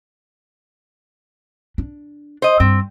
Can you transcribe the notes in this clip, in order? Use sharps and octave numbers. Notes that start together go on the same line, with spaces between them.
D4
C5 D#5
G2 C4